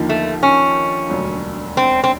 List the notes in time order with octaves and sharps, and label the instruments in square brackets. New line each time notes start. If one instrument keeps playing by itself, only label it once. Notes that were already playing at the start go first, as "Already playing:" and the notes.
Already playing: [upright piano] D#2 D3 F3 A#3 D#4
[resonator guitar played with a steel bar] A3
C#4
[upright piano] E1 D2 D3 F#3
[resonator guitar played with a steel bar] C4
C4